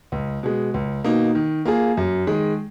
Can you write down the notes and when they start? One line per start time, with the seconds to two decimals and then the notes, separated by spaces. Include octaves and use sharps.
0.12 C#2
0.43 B2 G#3
0.74 C#2
1.04 B2 A#3 D#4
1.35 D#3
1.65 A#3 F4 G#4
1.97 F#2
2.27 D#3 G#3